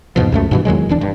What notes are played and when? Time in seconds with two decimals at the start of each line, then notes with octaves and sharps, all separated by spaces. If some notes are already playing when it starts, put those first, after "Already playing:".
0.16 E2 G#2 B2 F3
0.32 C#2 F#2 A3
0.51 G2 B2 E3
0.65 E2 D#3 F#3 G#3
0.89 E1 E3 D4
1.01 G2